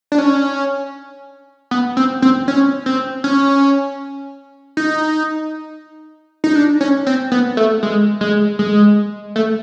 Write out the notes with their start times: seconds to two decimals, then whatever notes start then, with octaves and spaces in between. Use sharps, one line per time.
0.12 D4
0.18 C#4
1.71 B3
1.97 C4
2.22 C4
2.48 C#4
2.86 C4
3.24 C#4
4.77 D#4
6.44 D#4
6.55 D4
6.81 C#4
7.07 C4
7.32 B3
7.57 A3
7.83 G#3
8.21 G#3
8.59 G#3
9.36 A3